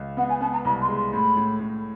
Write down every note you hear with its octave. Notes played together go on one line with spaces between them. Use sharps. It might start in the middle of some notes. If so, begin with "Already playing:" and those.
Already playing: C#2
B3 F#5
G#5
B3 A5
A#5
C2 B5
C6
G#3
C6
A2 B5
A2
A2